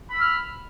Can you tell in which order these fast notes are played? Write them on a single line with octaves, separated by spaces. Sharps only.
B5 E6 F6